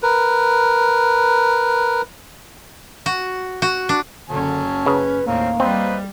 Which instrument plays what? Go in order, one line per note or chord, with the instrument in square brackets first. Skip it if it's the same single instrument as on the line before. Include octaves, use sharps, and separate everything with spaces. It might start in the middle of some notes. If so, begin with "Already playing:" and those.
[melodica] A#4 B4
[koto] F#4
F#4
D4
[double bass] F#1 C#4 [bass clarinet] D3 [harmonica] F#3 A5
[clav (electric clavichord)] C#3 [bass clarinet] B4
[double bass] D#2 A2 [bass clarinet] A#3 [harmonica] C4 C#4 A#4
[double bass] G3 [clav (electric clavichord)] C4 [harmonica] B4 C5 D#5